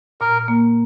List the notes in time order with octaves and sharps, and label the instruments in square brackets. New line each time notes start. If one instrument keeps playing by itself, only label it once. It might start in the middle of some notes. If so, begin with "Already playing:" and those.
[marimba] A#2 [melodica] A#4
[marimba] A#3